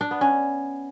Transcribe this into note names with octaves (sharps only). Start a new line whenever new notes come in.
D4
B3
C#4